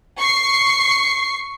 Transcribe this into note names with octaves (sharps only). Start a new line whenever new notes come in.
C#6 C7